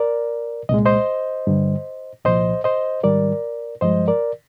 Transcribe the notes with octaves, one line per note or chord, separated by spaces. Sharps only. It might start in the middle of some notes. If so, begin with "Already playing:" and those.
Already playing: A#4 D5
C2 A#2 G#3 D#5
C5 D#5
G2 D3 G3
C2 A#2 F3 C5 D#5
C5 D#5
G#2 D#3 G3 A#4 D5
G2 F3 G#3 C5 D#5
A#4 D5